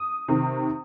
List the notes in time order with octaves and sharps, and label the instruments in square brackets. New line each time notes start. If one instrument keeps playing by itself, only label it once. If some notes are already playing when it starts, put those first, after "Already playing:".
Already playing: [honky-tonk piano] D#6
C3 D#3